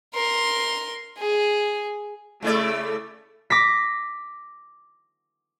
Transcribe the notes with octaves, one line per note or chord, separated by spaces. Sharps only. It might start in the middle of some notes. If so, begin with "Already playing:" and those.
A#4 C6
G#4
C#3 A3 E4 D5
D6 A#6 B6